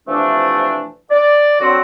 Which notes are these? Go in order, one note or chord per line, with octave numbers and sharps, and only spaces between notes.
C3 E3 F3 A3 D4
D5
D3 F#3 C4 F#4